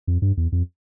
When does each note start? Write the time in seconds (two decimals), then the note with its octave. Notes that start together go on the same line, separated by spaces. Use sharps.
0.07 F2
0.22 G2
0.37 E2
0.52 F2